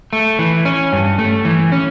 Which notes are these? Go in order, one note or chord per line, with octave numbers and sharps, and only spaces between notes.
A3
E3
C#4
G2
A3
E3
C#4